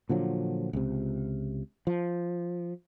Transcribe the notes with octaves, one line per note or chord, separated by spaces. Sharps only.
A#2 D3 F3 F#3
C#2 C3
F3